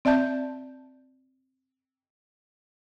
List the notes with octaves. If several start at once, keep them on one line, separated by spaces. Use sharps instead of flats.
C4 D5 E5 A5 G6